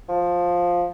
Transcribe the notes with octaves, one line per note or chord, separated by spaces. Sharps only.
F3